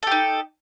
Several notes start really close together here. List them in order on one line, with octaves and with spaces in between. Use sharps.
A4 G4 D#4